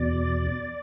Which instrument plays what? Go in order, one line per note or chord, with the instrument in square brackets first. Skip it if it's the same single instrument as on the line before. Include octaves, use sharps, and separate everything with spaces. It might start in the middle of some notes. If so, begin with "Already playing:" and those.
Already playing: [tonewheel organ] E2 B2 D5